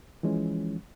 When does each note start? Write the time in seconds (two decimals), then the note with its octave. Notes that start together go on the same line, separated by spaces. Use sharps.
0.23 E3 F3 G#3 C#4